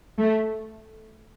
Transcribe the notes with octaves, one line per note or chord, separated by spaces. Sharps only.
A3